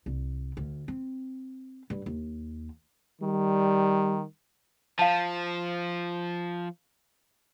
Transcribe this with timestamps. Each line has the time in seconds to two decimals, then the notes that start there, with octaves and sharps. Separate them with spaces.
0.06 C2
0.57 D2
0.88 C4
1.90 G2
2.06 D#2
3.22 D#3 G3
4.99 F3 F5 A5